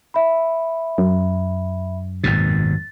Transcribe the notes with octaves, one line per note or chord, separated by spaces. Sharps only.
E5 B5
F#2
G#1 D#2 B2 A6